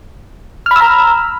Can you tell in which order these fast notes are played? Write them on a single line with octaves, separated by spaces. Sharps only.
F6 B5 E6 A#5